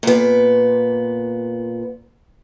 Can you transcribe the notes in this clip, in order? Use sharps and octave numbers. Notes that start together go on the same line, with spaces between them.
A#2 B3